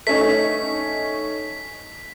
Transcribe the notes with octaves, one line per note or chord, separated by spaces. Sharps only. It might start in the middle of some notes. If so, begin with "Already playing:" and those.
A3 C#4 D#4 B6